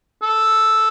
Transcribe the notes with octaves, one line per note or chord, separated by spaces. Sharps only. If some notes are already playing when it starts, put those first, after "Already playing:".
A4